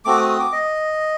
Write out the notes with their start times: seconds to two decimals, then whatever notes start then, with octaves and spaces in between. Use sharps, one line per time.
0.05 A3 C4 F#4 D6
0.17 D#6
0.28 D#6
0.40 D6
0.52 D#5